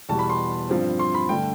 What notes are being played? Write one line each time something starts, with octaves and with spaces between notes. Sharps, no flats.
E2 B2 G3 A5
B5
C6
G2 F3 C4
C6
B5
G2 D3 A3 G5